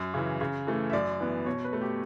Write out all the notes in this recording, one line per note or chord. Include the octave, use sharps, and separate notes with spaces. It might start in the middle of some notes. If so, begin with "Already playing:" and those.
Already playing: F#2
C#3 E3
C#3
E3 A3
E5
F#2 D5
E3 B3
B2 C#5
B4
A3
G4